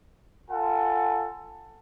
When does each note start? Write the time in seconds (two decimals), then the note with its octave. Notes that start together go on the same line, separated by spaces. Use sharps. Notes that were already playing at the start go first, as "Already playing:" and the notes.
0.50 F4 A4 F#5 G#5 A5